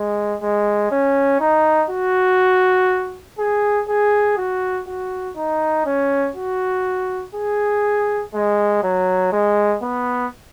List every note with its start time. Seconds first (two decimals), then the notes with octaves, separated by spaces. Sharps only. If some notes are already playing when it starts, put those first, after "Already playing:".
Already playing: G#3
0.42 G#3
0.91 C#4
1.40 D#4
1.90 F#4
3.39 G#4
3.88 G#4
4.37 F#4
4.87 F#4
5.37 D#4
5.86 C#4
6.36 F#4
7.35 G#4
8.34 G#3
8.83 F#3
9.32 G#3
9.82 B3